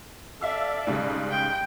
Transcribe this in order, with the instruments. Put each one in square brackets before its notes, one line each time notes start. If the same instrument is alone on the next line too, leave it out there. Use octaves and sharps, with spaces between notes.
[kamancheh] A4 D5 [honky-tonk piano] E5 F5 E6
[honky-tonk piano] G#2 C#3 G3
[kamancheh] G5